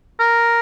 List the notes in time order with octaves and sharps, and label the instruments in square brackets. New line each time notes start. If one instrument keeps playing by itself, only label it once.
[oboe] A#4